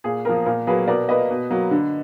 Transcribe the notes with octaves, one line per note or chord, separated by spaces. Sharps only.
A#2 G#4
F3 A#3 A#4
A#2 A#4
F#3 A#3 G#4 B4
B2 A#4 D5
A#3 B4 D#5
B2
F#3 A#3
D3